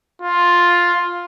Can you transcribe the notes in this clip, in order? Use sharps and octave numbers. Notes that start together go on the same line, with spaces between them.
F4